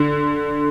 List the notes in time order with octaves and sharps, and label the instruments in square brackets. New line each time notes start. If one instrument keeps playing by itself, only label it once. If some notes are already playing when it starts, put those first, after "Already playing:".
Already playing: [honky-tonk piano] D3